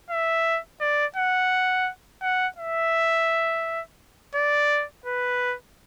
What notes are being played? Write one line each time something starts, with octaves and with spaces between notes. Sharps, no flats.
E5
D5
F#5
F#5
E5
D5
B4